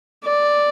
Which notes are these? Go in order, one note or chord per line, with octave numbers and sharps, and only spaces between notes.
D5